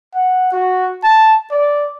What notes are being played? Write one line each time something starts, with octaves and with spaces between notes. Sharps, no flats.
F#5
F#4
A5
D5